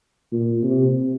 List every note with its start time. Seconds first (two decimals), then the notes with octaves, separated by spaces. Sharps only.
0.32 A#2
0.64 C3